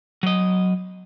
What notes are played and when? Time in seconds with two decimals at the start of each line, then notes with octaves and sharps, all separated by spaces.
0.23 F#3 D#5